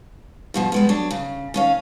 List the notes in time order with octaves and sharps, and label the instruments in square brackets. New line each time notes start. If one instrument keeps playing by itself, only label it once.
[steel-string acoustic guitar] G2 B2 F3
G3 G#3 B3
F#3 D4
C#3
D#2 C#4 F5